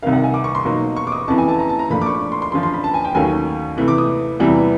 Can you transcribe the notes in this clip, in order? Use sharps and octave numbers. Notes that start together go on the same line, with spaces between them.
C2 C3 D#3 F5
F#5
G#5
D6
C#6
C6
B2 F#3 A#3 D#4
C#6
D6
D#6
F2 C#3 E3 A5
G#5
A5
A#5
A5
A#5
A#2 F3 A3 D4 B5
D6
C#6
C6
C6
F#2 D3 F3 C6
C6
B5
A5
G#5
G5
D#2 D#3 F#3 A3 C#4 G#5
C3 E3 A3
D6
D#6
E2 C3 E3 G3